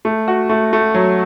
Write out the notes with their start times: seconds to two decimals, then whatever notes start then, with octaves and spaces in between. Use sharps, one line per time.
0.05 A3
0.28 F#4
0.49 A3
0.73 A3
0.94 F#3